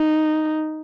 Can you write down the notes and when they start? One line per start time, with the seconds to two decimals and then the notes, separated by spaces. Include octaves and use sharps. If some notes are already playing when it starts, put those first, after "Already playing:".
Already playing: D#4